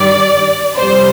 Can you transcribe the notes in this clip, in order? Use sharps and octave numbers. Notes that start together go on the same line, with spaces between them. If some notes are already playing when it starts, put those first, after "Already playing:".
Already playing: G2 D#3 G3 D5
F2 C3 G3 C5